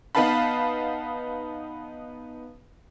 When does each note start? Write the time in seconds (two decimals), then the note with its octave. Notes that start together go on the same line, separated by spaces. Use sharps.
0.15 B3 D#4 B4 F5 A5 B5